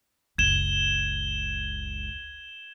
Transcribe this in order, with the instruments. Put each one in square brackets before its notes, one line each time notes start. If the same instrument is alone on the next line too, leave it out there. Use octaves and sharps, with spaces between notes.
[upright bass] F#1 [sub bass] C#2 [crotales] G#6 E7 G7